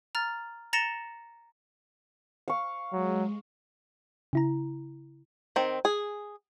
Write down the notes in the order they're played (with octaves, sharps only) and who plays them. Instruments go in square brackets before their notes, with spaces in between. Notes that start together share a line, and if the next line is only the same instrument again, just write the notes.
[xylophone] A#5 F6 A6
A#5 A6 A#6 C#7 E7 G7
[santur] F5 C#6
[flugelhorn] F#3 [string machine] G#3
[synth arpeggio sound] C#3 E4 A#5
[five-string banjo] D#3 C4
G#4